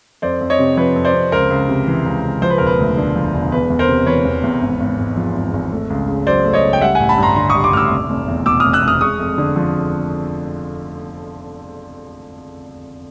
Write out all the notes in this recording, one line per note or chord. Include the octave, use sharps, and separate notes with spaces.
F2 C5 D5
F2
C#5 D#5
C3
F3 B4 C#5
F2
C5 D5
F2
C#2 A#4 C5
C#2
C3
E3
C#2
C#2
F3 C5
B4
E1 A#4
B4
D2
D3
F3
E1
E2 B4
E2
A#4 C5
C3
E3 B4 C#5
E2
E2
G#1
G#1
G#2
F3
G#1
G#1
A3
C#2
C#3
F#3 C5 D5
A3
C#5 D#5
C#2
G5
G3 E5 F#5
A1 F#5 G#5
A5 B5
G2 A#5 C6
D3 A#5 C6
C#6 D#6
G3
C6 D6
A1 D6 E6 F6
F1
F1
E2
B2 D6 E6
F1 D#6 F6
E6 F#6
F1 D#6 F6
G#3 C#6 D#6
F2
D3
F3